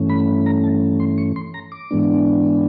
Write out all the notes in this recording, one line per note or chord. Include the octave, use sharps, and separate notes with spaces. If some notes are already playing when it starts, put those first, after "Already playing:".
Already playing: G2 E3 A3 C#4
B5
A#5
A5
C6
C#6
C6
A#5
D6
G#2 E3 G#3 B3 D4